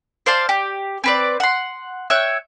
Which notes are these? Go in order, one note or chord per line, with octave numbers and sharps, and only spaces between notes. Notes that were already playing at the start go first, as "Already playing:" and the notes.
C5 D5 F5 A5
G4
C4 B4 D5
F#5 C6
C#5 E5 G5 F#6